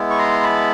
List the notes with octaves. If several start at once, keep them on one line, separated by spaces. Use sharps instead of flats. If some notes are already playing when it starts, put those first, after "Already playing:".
Already playing: G#3 B3 E4
C#6
A#5 C6
A5 B5